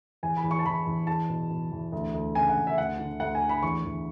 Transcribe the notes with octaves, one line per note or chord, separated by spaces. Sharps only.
E2 G#5
B5
E2
C#6
A5
E2 B5
E2
E2 A5
B2
B2
E2
D2
D2
C#3 G#5
F#5
D2
E5
D2 F#5
D3
D2 F#5
G#5
D2
B5
E2 C#6
E2